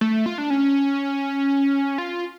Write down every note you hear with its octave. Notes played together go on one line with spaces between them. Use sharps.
A3
F4
D4
C#4
F4